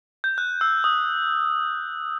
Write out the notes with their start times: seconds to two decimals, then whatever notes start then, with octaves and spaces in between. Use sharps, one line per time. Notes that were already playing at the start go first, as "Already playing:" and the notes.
0.24 G6
0.38 F#6
0.61 E6
0.84 D#6